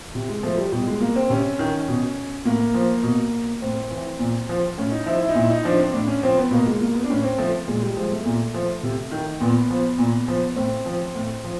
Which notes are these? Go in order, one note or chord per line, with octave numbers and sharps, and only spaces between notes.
C3
G#3
F3 A3
G3
B2 G3
G#3
A#3
C4
C3 C#4
D#3
B2
A2 A#3
F3
B2
A2 C4
E3
A#2
F3
A2 C#4
D#4
F3 E4
E4
D#4
A#2 E4
D#4
F3 D4
C4
A2 D4
C#4
F3 C4
B3
B2 A#3
G#3
A#3
B3
D4
A2 C#4
C4
F3 A3
A#2 G#3
G3
F3 G#3
A3
A#2
F3
C3
D#3
A#2 B3
F3
A#2
F3
A2 C4
F3
A2
F3